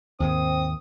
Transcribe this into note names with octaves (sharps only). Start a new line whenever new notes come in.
D#2 G#2 D#3 C4 D#6